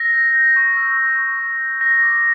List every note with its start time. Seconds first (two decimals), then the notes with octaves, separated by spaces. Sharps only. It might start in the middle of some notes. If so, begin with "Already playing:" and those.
Already playing: E6 A#6
0.13 G6
0.35 G6
0.56 C#6
0.77 E6
0.98 C#6
1.19 C#6
1.39 C#6
1.60 G6
1.81 G6 A#6
2.02 D6